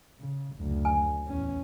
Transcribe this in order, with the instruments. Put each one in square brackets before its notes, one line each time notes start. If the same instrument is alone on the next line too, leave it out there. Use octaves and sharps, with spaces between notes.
[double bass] C#3
F#1 D2
[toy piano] G#5
[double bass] E2 C#4